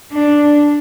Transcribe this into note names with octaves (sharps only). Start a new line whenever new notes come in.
D4